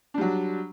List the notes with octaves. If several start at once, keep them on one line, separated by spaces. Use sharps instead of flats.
F#3 G3 D4